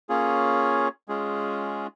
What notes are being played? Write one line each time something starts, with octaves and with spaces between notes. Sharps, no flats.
A#3 C#4 F4 G#4 C#5
G#3 C#4 F4 G#4